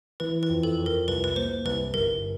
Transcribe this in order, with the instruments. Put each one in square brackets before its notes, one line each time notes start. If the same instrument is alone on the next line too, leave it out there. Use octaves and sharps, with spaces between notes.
[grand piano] E3 [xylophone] B4
[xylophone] B4
[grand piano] F2
[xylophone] A4
[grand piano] F2
[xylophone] A#4
[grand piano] C2 [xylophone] B4
[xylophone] B4
[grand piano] A#3 [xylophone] C5
[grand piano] C2 [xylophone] B4
[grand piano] G1 [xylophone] A#4